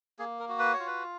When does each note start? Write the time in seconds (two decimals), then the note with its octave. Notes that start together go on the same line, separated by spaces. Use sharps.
0.19 A#3 G#4
0.39 A#4
0.49 F#4
0.59 B4
0.73 C#5
0.80 F4
0.87 B4